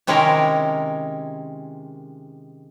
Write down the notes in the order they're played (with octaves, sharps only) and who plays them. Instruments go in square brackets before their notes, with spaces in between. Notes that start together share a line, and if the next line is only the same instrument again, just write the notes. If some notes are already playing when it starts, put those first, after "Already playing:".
[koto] C3 D#3 G#3 C#4 E4 A#4